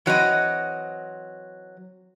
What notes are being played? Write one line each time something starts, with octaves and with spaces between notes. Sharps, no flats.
E3 F#3 C4 D#5